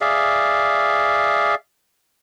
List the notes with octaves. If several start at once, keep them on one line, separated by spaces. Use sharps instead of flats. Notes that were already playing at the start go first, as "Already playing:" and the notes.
G#4 D5 E5 F5